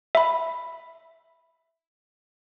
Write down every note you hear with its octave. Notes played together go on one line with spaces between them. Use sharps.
E5 B5